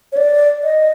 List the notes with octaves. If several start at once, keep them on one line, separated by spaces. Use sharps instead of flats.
C#5
D5
D#5